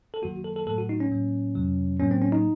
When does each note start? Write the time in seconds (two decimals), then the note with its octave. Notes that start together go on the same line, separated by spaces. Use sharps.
0.14 A4
0.22 F#2 D#3 F#3 A#3 F#4
0.44 A4
0.56 A4
0.67 A2 F#3 A3 A4
0.78 F#4
0.89 D#4
1.00 C#4
1.11 A2 F#3 A#3
1.55 F2 C3 F#3
1.99 A2 F#3 A#3 C#4
2.11 C4
2.22 C#4
2.32 D#4